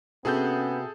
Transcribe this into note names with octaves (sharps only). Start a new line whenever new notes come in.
C3 B3 C#4 F#4 G#4 A4 F#5 G6